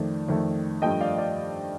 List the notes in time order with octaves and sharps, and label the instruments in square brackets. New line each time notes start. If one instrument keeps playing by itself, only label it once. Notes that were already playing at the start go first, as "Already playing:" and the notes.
Already playing: [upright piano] F2 D#3 A3 D5
F2 D#3 A3
G2 F3 A3 D#5 G5
D5 F5
D5 F5